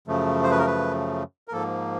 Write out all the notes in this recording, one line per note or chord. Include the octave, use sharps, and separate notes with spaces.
F#2 C#3 F3 A3
C5
B4
A#4
B4
A#4
G#2 F3 A#3 A4